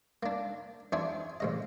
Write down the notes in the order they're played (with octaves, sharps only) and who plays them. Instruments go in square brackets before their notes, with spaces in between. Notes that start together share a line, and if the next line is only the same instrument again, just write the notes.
[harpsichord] A#3 D4
E2 D4 G#4 E5 C6
A1 C#3 D#5